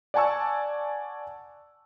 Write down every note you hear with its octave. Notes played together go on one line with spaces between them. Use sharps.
D5 F#5 G#5 A5 C#6 E6